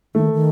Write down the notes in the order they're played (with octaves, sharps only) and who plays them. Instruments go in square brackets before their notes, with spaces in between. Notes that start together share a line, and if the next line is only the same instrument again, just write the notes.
[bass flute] D#3 [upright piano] A3
[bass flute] D#3